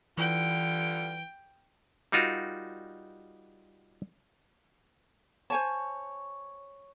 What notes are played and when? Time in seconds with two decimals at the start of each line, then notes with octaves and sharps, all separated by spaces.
0.18 D3 E3 G3 F4 B4 G5
2.12 G3 D#4 F4 F#4 A#4
5.50 C5 C#5 G#5 A5